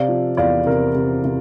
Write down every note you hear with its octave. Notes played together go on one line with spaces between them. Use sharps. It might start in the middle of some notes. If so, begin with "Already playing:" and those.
Already playing: C3 D5 F5
F3
E2 D5 F5
C3 A#4
C3
C3